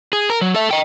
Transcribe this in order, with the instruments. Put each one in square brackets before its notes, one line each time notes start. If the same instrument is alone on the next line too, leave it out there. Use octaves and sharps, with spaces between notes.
[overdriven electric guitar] G#4
A#4
F#3
A4 E5
D#5 G5